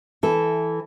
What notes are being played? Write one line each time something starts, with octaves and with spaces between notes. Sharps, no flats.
E3 A4